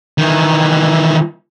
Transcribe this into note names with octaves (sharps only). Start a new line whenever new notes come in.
D#3 E3